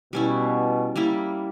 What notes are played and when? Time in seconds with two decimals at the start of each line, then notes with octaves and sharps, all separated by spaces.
0.13 B2 G3 C#4 E4
0.96 G3 A#3 E4